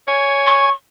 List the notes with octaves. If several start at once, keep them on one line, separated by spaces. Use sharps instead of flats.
C#5 G#5
C#6